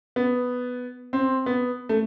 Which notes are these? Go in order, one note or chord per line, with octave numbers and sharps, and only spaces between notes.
B3
C4
B3
A3